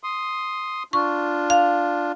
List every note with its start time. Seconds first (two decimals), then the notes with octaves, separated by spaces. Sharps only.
0.04 C6 D#6
0.93 D4 F4 C#6
1.50 F5